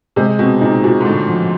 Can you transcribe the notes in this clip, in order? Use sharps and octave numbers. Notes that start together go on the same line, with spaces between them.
C3 G#3
B2 C4
A#2 D#4
A#2 F#4
G#2
A2 D3
F3